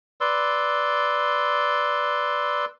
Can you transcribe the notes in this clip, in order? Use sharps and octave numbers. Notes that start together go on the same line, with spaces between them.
B4 D5 C6 E6